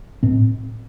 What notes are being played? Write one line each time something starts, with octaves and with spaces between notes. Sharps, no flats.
A2 C4